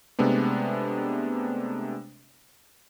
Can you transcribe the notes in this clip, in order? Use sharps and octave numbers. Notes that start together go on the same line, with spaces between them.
C3 G#3 A3 B3 D4